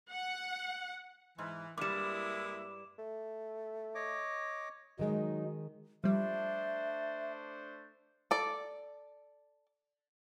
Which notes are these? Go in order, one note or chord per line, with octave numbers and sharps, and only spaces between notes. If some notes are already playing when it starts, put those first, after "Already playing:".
F#5
G#2 E3
G2 G3 G#3 A#3 E4 D6 E7
A3
C#5 D#5 D6
D#3 F#3 G#3 D#4
F3 G3 A3 D4 C5 E5
A4 D5